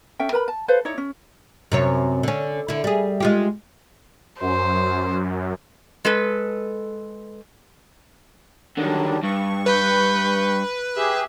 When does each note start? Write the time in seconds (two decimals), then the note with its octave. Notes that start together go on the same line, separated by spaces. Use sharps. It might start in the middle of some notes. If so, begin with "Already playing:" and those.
0.19 C#4 A4 E5 G5
0.33 A#4 B4 A#5 B5
0.48 A5
0.68 A4 B4 C5 F5
0.85 D#4 E4 C#5 D5
0.98 C#4
1.72 F#2 C3 C#5
2.23 D3 C#4
2.68 D3 E4
2.84 G3 G#4
3.20 G#3 F4 G4
4.41 F#2 C5
6.05 G#3 A4 B4
8.78 D3 D#3 F#3 G3 D4
9.23 G2 C#6
9.66 B4 B5 G6
10.97 G4 G#4 E5